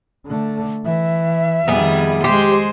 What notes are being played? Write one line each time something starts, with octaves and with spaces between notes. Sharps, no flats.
D3 A3
E3 E5
F2 D#3 G3 B3 G#4
G#3 G4 C5